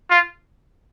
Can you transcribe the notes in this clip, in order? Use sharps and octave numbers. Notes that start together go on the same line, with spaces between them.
F4